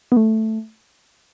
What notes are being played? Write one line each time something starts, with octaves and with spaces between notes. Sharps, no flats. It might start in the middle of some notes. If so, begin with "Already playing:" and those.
B3
A3